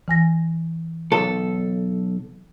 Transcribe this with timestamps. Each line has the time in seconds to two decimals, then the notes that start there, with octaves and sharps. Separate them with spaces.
0.08 E3 G#5 A#6
1.12 B1 A4